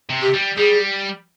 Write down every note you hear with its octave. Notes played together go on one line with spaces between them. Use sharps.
C3
G4
G3
G3 G#4